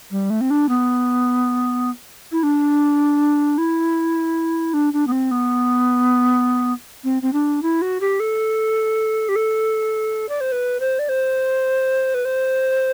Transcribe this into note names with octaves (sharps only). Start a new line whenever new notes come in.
G3
A3
C4
D4
B3
E4
D4
E4
D4
D4
B3
C4
B3
C4
C4
D4
E4
F#4
G4
A4
G4
A4
D5
C5
B4
C5
D5
C5
B4
C5